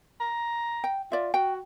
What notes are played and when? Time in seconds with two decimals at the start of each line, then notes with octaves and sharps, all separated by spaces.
0.20 A#5
0.84 G5
1.12 F4 D5 E5
1.34 F#4 G5